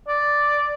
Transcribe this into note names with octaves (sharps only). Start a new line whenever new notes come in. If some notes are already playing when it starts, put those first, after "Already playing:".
D5